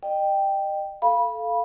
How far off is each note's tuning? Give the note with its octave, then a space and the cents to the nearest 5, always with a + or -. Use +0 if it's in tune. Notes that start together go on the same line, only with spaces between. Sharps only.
D#5 -35 G5 +0
A4 -10 F5 -10 B5 -20